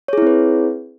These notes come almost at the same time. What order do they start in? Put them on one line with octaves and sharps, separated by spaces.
C#5 G#4 E4 C4 B4